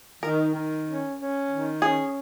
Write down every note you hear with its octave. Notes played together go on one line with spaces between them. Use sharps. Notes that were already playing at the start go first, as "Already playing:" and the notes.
D#3 A#4
D#3
C#4
C#4
D#3
C#4 G#4